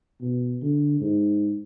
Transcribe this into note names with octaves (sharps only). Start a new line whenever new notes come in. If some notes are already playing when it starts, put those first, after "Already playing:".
B2
D3
G#2